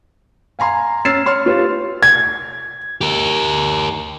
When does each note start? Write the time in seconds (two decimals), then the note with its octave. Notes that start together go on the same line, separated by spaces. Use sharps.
0.59 F5 G#5 A#5 C6
1.05 C#4 E6 F6 A6 C7 E7
1.26 C#5 C6 F6
1.46 F4 G4 B4 C#5
2.03 G#6
3.01 G4 A#4